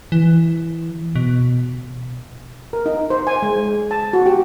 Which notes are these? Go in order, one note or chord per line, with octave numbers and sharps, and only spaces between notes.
E3
B2
A#4
D#4
C5
G#5
G#3
A5
F#4
G4